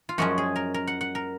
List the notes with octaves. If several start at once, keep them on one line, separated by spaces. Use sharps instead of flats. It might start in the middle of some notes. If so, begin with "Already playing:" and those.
F4
F#2 F3 G#3 C#4 F#4
G#4
A#4
A#4
F#5
F#5
A#4